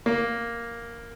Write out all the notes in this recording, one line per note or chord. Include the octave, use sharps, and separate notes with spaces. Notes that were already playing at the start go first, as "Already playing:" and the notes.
A#3